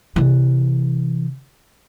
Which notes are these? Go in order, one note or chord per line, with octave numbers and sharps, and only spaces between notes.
C3 E3